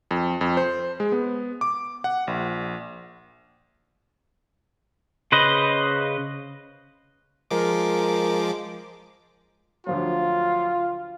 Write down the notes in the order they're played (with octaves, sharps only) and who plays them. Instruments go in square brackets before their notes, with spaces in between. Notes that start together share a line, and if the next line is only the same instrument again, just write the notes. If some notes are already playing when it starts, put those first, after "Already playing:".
[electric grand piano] F2
F2
C5
G#3
B3
D6
F#5
A#1
[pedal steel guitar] C#3 B4 C5 D#5
[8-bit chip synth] F3 G#3 D6 [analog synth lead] A#4
[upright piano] D2 F3 F#3 [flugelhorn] F4 [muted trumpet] F5